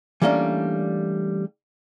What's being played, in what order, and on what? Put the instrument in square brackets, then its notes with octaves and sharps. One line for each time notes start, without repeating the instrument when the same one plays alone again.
[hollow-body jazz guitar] E3 G3 A3 A#3 C#4 D4